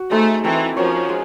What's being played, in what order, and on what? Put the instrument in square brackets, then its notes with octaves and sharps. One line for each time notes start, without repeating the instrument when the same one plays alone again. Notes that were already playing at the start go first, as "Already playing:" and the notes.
Already playing: [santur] F#4
[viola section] A3 [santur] D#4 G#4 C5 E5
[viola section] E3 [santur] A3 C4 D#4
[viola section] F3 [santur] C#4 F#4 A#4 C#5
[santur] G#3